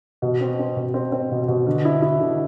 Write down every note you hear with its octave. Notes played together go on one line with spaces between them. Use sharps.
B2
C4
C4
B2
C4
C4
B2
B2
D3
E4
E4
D3